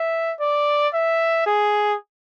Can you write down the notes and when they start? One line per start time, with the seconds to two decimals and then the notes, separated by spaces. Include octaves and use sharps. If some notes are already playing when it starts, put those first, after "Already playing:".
Already playing: E5
0.40 D5
0.93 E5
1.46 G#4